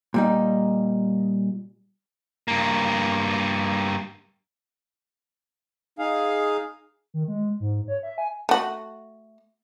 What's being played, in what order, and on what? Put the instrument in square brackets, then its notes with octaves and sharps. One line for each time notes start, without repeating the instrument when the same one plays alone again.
[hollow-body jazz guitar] A#2 G3 D#4
[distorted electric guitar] G2 A#3
[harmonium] D#4 G#4 F5
[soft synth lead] D#3
G#3
G#2
C#5
E5
G#5
[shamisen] A3 F#4